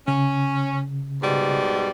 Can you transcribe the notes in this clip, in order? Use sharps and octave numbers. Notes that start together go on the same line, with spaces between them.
C#3 C#4
G#2 B2 G3